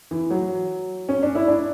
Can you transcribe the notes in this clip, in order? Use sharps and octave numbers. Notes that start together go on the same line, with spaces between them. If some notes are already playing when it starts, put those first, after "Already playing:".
E3
F#3
C#4
D4
E4
D4